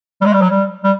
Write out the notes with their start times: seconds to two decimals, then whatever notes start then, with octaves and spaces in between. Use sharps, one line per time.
0.22 G3
0.25 G#3
0.33 G3
0.41 F#3
0.50 G3
0.84 G3